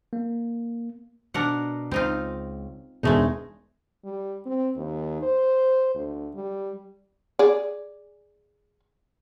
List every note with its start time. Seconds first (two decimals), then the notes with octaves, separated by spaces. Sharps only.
0.13 A#3
1.34 B2 D4 A#4 F#5
1.91 C#2 C4 D#4 F4
3.03 E1 D2 G#3 A3 D#4
4.05 G3
4.46 C4
4.76 D#2
5.23 C5
5.95 D2
6.35 G3
7.39 G#4 D5